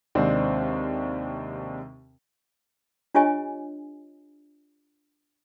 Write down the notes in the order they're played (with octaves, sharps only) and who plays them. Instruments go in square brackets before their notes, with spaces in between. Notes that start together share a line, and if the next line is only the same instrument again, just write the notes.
[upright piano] D#2 C3 G#3 C4 D4
[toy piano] D4 F4 G4 C#5 D#5 G#5